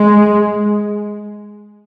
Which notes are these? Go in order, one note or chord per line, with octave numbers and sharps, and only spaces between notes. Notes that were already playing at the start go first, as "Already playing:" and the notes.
Already playing: G#3